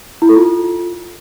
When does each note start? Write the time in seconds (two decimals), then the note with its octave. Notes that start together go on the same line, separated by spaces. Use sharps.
0.22 E4
0.29 A4
0.36 F4